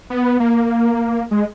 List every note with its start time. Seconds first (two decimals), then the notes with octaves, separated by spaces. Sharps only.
0.10 B3
0.40 A#3
1.31 G#3